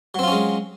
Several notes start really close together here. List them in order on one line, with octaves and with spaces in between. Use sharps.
F#3 C4 F4 C#4 G#3